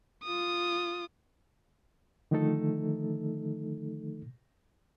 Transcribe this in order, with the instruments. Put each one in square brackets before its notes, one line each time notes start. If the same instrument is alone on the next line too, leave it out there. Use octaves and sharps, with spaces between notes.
[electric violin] F4 D#6
[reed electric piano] D3 D#3 F3 A3 D#4 A4